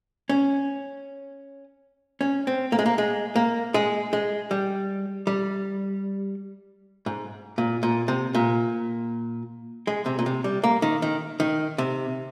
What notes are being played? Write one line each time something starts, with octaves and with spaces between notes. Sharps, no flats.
C#4
C#4
C4
A#3
G#3
A#3
G#3
A#3
G#3
G#3
G3
G3
G#2
A#2
A#2
C3
A#2
G#3
C3
A#2
C3
G3
A#3
D#3
D#3
D#3
C3